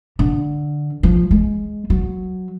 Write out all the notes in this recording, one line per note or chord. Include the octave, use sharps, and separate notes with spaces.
D3
F3
G#3
F#3